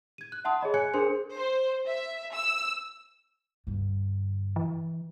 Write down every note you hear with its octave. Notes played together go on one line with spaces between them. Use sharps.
G#6 D#7
F#6
E5 F#5 A5 C6 D#6
G#4 C#5 D#5 B5
G#5 F#6 G#6 C#7
D4 G#4 A#4 C5 C6 C#7
C5
E5
E6
G2 D3
E3